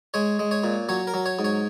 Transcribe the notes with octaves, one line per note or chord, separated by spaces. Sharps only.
G#3 C#5
G#3
C#5
A#2
F#3 C#5
A#4
F#3
C#5
G#2
C#5